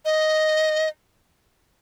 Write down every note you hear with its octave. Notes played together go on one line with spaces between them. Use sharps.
D#5